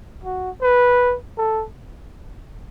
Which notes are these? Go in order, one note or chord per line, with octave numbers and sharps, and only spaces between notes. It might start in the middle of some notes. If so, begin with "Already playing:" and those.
F#4
B4
A4